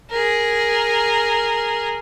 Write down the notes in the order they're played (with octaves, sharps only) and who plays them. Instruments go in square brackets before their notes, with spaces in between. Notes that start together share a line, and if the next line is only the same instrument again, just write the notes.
[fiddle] G#4 A#4